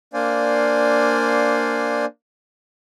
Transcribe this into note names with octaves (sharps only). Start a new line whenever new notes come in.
A#3 D4 C5 D5 F5 G#5